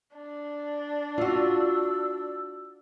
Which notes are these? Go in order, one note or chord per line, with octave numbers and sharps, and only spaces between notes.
D4
F4 F#4 E6